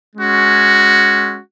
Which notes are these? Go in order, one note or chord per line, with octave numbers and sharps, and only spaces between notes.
G#3 C#4 F#4